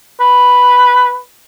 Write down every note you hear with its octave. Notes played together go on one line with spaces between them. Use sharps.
B4